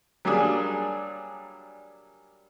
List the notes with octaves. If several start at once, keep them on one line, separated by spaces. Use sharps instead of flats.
F#3 G3 A#3 D4 G#4